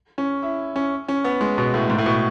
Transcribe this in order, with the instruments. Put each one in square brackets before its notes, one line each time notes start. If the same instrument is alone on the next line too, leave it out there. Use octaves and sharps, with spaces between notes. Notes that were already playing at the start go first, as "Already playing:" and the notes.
[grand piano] C#4
E4
C#4
C#4
B3
G#3
B2
A2
G#2
A2
B2